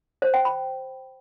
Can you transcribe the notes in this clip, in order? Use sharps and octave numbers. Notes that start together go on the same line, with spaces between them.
C5
G5
B5